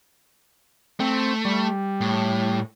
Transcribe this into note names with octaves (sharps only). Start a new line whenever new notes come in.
A3 C4
G3
A2